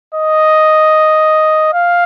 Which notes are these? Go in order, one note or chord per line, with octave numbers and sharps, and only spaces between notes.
D#5
F5